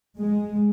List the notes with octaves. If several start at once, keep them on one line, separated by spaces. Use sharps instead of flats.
G#3